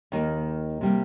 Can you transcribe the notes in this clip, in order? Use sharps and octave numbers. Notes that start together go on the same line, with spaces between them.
D#2 D#3 A#3
C3 G3 A#3